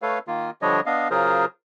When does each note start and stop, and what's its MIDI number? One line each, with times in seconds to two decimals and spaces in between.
0.02 0.19 57
0.02 0.19 69
0.02 0.19 71
0.02 0.19 73
0.02 0.19 77
0.28 0.50 51
0.28 0.50 58
0.28 0.50 65
0.62 0.80 50
0.62 0.80 53
0.62 0.80 55
0.62 0.80 62
0.62 0.80 73
0.62 0.80 75
0.86 1.08 59
0.86 1.08 62
0.86 1.08 75
0.86 1.08 77
1.11 1.45 49
1.11 1.45 54
1.11 1.45 65
1.11 1.45 68
1.11 1.45 70
1.11 1.45 72